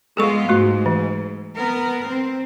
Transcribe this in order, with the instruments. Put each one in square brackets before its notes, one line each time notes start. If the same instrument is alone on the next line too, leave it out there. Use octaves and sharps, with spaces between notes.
[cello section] G#3 B3 F4 [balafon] G#4 A4 C#6
[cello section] G#2 [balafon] A3 F#4
[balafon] E3
[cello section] B3 A#4
C4